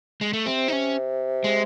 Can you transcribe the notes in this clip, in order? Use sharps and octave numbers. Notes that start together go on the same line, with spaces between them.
G#3
A3
C3 C4
D#4
C#4
G#3